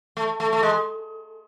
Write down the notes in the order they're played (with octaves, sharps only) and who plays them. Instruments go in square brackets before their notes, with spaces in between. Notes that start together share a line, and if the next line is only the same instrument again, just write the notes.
[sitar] A3
A3
A3
G#3